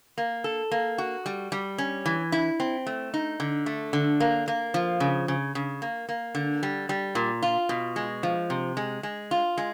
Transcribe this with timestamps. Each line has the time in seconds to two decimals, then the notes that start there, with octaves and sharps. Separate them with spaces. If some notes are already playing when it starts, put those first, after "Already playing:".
0.18 A#3
0.44 A4
0.71 A#3
0.98 F#4
1.26 G3
1.52 G3
1.78 C#4
2.06 E3
2.32 E4
2.60 C4
2.86 A3
3.14 D#4
3.40 D3
3.66 A3
3.93 D3
4.20 A#3
4.48 A#3
4.74 F3
5.00 C#3
5.28 C#3
5.55 C#3
5.82 A#3
6.09 A#3
6.35 D3
6.63 G3
6.89 G3
7.15 A#2
7.42 F4
7.69 B2
7.96 G#3
8.23 F3
8.50 C3
8.77 G#3
9.03 G#3
9.31 F4
9.58 G#3